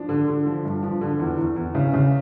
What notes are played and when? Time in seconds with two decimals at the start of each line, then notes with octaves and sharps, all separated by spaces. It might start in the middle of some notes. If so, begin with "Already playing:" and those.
Already playing: F3 D4
0.09 D3
0.28 D3
0.46 F3
0.65 G2
0.83 F3
1.01 D3
1.20 E2
1.37 E2
1.56 E2
1.75 C#3
1.94 C#3